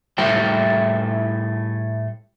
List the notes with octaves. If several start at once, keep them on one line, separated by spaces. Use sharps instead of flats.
A2 G3 A3 E4 C5 G5